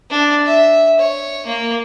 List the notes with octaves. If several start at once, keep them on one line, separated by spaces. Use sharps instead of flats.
D4
E5
C#5
A#3